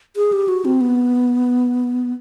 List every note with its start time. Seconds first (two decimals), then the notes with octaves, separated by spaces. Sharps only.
0.16 G#4
0.33 G4
0.48 F#4
0.65 C4
0.81 B3